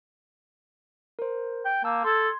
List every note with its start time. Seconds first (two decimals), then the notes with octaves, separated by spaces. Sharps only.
1.19 A#4 C5
1.65 G5
1.84 A#3 A5 E6 G6
2.04 A4 C6 G#6